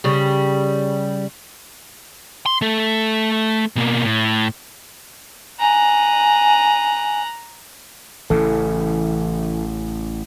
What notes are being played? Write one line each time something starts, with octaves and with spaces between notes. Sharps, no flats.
C#3 G3
C6
A3 A4
B2 A#3
A2
G#5 A#5 F#6
A1 C#3 E3 A4